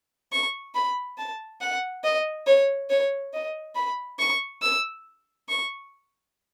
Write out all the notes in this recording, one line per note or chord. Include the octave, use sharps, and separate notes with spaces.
C#6
B5
A5
F#5
D#5
C#5
C#5
D#5
B5
C#6
E6
C#6